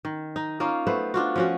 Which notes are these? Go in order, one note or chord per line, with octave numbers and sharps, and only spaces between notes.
D#3
D#4
A#3 C#4 D#4 F4
A3 B3 B4 C5
D4 F4 F#4
F3 C#4 F#4